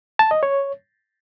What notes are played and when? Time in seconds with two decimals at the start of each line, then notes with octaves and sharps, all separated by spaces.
0.19 A5
0.31 D#5
0.43 C#5